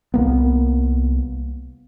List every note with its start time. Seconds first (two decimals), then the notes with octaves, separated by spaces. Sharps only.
0.14 C2 A#3 B3